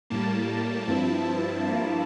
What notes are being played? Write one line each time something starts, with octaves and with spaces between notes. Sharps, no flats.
A2 G3 A#3 A5
G2 F3 C4 E4
G2 F3 A#3 E4